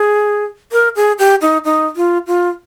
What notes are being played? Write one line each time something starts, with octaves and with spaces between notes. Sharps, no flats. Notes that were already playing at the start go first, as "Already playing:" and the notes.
Already playing: G#4
A#4
G#4
G4
D#4
D#4
F4
F4